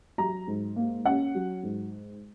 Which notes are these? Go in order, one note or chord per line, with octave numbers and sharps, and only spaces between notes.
F#3 A#5
G#2
A#3
C#4 F#5
F#3
G#2